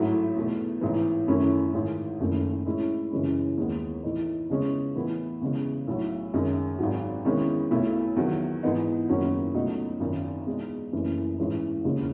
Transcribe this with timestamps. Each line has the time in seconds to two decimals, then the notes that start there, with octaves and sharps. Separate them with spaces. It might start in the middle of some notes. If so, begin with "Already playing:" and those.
Already playing: A1 G#2 F#3 A3 E4
0.36 E2 B2 A3
0.81 A1 G#2 E3
1.27 F#2 D#3 A3 C#4 E4
1.73 A1 G#2 D#3
2.20 F#1 F#2 D#3 A3
2.66 A2 G#3 C#4 E4
3.11 F#2 C#3 E3 G#3 C#4
3.57 D#2 D#3 G#3 B3
4.03 A2 E3 A3 D#4
4.50 E2 C#3 G#3 C#4
4.95 A2 E3 B3 E4
5.41 E2 C#3 G#3
5.87 B1 A2 F#3
6.34 F#2 D#3 G#3
6.79 G#1 G#2 F#3
7.25 E2 D#3 G#3 C#4 E4
7.71 B1 B2 A3 E4
8.16 E2 D#3 F#3
8.63 G#2 E3 B3 D#4
9.09 F#1 E2 D#3 F#3 C#4
9.54 C#2 B2 F#3 A3 D#4
10.00 G#1 F#2 D#3
10.46 E2 B2 G#3 D#4
10.93 F#1 F#2 E3 A3
11.38 A1 G#2 E3 G#3 C#4
11.84 E1 D#2 C#3 G#3